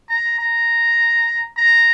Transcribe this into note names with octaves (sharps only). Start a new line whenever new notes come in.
A#5
A#5
A#5